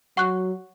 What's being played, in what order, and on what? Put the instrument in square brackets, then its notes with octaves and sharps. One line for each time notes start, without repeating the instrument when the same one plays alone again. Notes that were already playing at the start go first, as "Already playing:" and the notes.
[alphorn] F#3 [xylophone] F#5 C#6 F#6